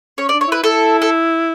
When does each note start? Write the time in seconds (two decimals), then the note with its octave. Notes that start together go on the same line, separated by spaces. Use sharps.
0.18 C#4 C#5
0.29 D5
0.33 D4
0.41 C#5
0.48 E4 B4
0.64 E4 A4
1.02 A4